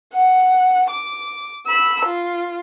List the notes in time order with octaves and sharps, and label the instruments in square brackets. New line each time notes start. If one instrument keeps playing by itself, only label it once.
[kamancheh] F#5
D6
B5 E6
F4